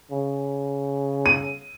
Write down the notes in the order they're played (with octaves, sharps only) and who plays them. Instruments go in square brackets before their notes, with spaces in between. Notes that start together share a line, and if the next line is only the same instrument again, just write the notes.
[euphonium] C#3
[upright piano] D#7